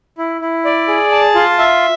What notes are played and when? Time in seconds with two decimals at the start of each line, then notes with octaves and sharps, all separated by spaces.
0.18 E4
0.41 E4
0.65 D5
0.88 G#4
1.12 A5
1.35 F4
1.59 E5